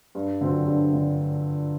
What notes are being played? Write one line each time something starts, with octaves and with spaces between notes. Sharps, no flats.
G2
D3 F#3 C4
G2
D3